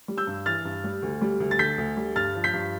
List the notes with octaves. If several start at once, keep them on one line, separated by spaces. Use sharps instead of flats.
G3
E6 G6
G2
E3 F6 A6
G2
G3
D2
G3
D2
A6
D3 G6 B6
D2
G3
G2 F6 A6
F3
G6 B6
G2